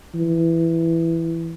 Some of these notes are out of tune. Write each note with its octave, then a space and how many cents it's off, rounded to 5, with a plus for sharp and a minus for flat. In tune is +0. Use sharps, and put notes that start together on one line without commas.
E3 +5